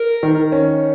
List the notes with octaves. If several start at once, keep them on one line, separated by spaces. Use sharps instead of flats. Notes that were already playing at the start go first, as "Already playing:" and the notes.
Already playing: A#4
D#3
C#4